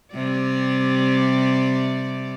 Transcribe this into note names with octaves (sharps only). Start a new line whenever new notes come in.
C3 G3 D5